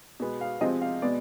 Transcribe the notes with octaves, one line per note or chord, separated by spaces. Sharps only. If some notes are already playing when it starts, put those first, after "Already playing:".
B2 G#3 B3
F5
C3 F3 G#3 C4 D#5
F5
B2 G#3 B3 D5